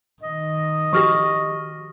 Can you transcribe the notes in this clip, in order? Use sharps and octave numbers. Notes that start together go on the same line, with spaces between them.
D#3 D#5
F3 F#4 G4 C#6 F6 A#6